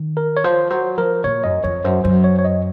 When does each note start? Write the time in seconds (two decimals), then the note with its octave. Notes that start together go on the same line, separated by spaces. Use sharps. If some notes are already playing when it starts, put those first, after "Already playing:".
Already playing: D#3
0.17 A#4
0.37 C#5
0.44 F3 C5
0.70 F#3 C5
0.98 F3 A#4
1.24 A#2 C#5
1.44 F#2 D#5
1.64 F2 C#5
1.84 F#2 C5
2.04 F#2 C5
2.24 C#5
2.39 C#5
2.44 D#5